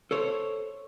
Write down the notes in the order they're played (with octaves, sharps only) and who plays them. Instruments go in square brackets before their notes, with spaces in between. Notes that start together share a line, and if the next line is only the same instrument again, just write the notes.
[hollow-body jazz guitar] A4 C5 C#5